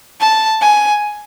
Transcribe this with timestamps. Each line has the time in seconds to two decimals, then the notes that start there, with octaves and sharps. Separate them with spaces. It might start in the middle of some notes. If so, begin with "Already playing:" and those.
0.20 A5
0.61 G#5